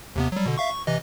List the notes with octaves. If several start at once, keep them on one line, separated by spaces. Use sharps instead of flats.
D#2 C3 B3
F#3 G3
B2 D3
E5 F5 C#6
C#6
C3 E3 D#5